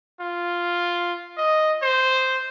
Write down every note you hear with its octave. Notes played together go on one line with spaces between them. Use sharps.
F4
D#5
C5